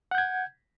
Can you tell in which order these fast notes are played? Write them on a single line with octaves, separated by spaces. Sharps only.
F#5 G6 G#6